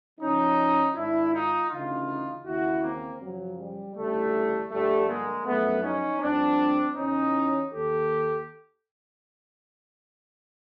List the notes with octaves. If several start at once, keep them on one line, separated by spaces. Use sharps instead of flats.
F2 C#3 F3 C#4 D#4
G#2 D#3 D4 E4
D#4 F4
D2 C#3 E3 D#4 F4
D#2 C#3 E3 E4 F#4
A#3 C4
F#2 C#3 F3 F#3
G3
D2 C#3 E3 G3 A3
G2 D3 F3 G3 A3
G#3 A#3
F#2 D3 F3 A3 B3
C#4 D#4
G2 D3 F3 C4 D4
E2 C#3 E3 C#4 D#4
D#2 D#3 G4 A4